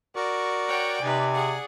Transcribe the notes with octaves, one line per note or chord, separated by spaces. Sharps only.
F#4 A#4 D5 C#6
C#5 F#5 G5
C3 D#4 B4 G#5
G#4 F#5